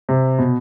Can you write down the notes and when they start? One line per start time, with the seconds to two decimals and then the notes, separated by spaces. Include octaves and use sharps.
0.09 C3
0.39 B2